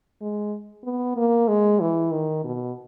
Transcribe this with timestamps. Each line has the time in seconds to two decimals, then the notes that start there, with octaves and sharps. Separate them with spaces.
0.21 G#3
0.84 B3
1.17 A#3
1.48 G#3
1.80 E3
2.12 D#3
2.44 B2